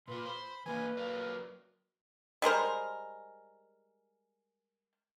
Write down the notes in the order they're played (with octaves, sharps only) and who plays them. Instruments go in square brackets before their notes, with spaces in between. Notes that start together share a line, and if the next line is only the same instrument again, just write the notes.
[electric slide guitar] A#2 F4 [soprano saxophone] B4 [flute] C6
[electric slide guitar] C5 [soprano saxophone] B5
[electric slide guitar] E3 A#3 D4 [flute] B4 [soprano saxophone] G#5
[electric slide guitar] F#3 A#4 D5 [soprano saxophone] A#3
[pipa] G3 G#3 A#4 C5